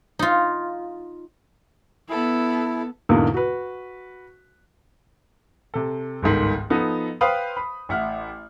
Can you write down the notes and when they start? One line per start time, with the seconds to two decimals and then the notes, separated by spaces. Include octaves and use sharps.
0.19 D#4 F4
2.10 B3 E4 A4
3.09 E2 G#2 B2 D3 A#3 F5
3.34 F#4 B4
5.74 C3 A4
6.22 G1 C#2 G#2 D#3
6.70 F3 B3 D#4 A4
7.21 B4 C5 F5 G5 B5 D#6
7.57 B5
7.89 A1 E5 F#5 F6